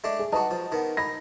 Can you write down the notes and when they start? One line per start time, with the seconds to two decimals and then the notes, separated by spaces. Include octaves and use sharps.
0.04 G#3 A3 D4
0.19 G#4
0.32 D#4 F#4 B4 D#5 A5
0.51 F3
0.72 D#3 B3
0.97 D#4 B5 A#6